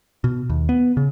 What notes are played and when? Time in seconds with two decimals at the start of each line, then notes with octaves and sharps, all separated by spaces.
0.24 B2
0.50 D#2
0.69 B3
0.97 C#3